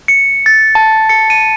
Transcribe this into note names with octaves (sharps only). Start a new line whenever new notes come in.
C#7
A6
A5
C#7
D#7